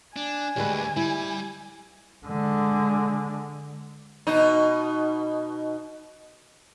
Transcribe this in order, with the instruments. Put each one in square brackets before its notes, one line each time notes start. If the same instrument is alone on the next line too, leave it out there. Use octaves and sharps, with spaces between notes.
[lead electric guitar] D4 [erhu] G#5
[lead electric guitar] D2 [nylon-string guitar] G3 G#3 B4
[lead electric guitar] G3 [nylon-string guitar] E4
[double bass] D3 G#3
[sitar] B2 D#4